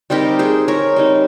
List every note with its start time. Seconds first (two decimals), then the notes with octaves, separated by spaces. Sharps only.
0.10 G3 C4 D#4 G4 A#4
0.39 G#4 C5
0.68 A#4 C#5
0.96 G3 C4 D#4